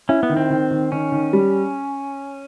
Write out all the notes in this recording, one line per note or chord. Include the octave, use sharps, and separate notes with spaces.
C#4 E4
B3
D#3
C4
D#3
D#3
D#3 C#4
D#3
G3